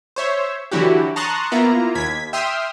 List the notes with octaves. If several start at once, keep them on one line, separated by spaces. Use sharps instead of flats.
C5 C#5 E5
D3 E3 F#3 E4 F#4 G4
A5 A#5 C6 C#6 D#6 F#6
A#3 B3 E4 F4 A#5
D#2 G#6 B6
E5 G5 C6 D#6 F6